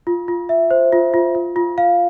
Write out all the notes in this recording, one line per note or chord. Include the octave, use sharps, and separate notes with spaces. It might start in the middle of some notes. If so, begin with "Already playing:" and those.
F4
F4
E5
C5
F4
F4
F4
F4
F5